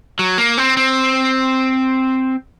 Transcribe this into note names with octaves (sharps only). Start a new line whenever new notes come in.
F#3
A#3
C4
C4